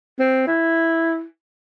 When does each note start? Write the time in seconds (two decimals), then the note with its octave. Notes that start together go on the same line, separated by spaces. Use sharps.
0.19 C4
0.47 E4